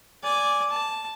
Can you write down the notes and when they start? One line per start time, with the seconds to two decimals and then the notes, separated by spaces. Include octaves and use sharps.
0.23 D5 G#5
0.70 A5